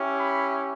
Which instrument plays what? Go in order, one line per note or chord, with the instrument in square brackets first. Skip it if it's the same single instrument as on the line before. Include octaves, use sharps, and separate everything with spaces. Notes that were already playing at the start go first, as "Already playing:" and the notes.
Already playing: [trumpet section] C#4 E4 G4
B5